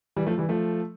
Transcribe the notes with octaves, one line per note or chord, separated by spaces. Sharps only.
E3 G3
F3 A3
E3 G3
F3 A3